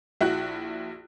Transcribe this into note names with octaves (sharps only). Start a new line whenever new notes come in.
A#1 E4 F#4 F#6